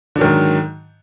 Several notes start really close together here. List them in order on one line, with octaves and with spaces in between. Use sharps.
D3 F#3 D#3 G#2